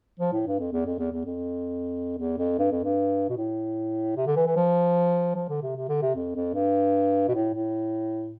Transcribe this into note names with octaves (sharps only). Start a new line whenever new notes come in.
F3
A2
G2
F2
E2
F2
E2
E2
F2
E2
F2
G2
F2
G2
B2
A2
C3
D3
E3
E3
F3
F3
D3
C3
C3
D3
C3
F2
F2
G2
B2
A2
A2